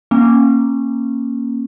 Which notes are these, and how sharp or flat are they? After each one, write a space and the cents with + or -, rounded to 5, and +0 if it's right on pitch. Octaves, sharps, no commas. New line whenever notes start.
A#3 +0 C#4 -20